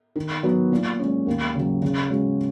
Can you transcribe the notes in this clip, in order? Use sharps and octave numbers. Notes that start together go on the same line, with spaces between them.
D#3
F#3 B3 F#4
A#2
G#3 C#4
D#2
C#3 F#3
C#3
G#3 C#4 F#4